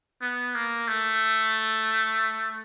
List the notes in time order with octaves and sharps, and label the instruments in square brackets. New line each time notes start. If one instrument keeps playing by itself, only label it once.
[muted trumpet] B3
A#3
A3